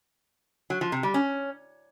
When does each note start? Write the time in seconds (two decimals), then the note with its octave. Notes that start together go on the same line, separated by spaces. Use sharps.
0.70 F#3
0.81 F3
0.92 C3
1.03 G3
1.14 C#4